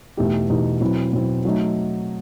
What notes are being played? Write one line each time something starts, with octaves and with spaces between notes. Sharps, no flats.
E2 B2 A3 D#4 G4
E2 B2 A3 D#4 G4
B2 F#3 C4 E4
B2 F#3 C4 E4
F#3 A3 D#4